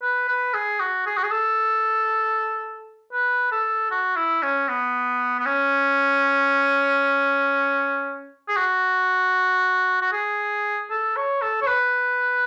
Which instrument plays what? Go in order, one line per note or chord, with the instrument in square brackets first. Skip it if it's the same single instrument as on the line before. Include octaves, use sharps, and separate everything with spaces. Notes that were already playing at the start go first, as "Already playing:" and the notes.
[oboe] B4
B4
G#4
F#4
G#4
F#4
G#4
A4
B4
A4
F#4
E4
C#4
B3
B3
C#4
G#4
F#4
F#4
G#4
A4
C#5
A4
C#5
B4